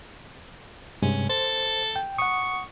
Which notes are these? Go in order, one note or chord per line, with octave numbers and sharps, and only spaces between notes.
G2 C3 G#3 C#4
A4 C5
G5
F#5 C#6 D#6